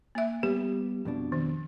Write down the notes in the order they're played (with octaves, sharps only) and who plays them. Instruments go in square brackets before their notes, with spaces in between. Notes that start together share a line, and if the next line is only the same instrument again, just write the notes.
[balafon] A#3 E5
[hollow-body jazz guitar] G3 B3 [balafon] G4
[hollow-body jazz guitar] F2 B2 D4
[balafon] D#3